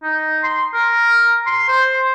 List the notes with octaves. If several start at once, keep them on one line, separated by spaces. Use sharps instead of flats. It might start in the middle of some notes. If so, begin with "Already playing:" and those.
D#4
C6
A#4
C6
C5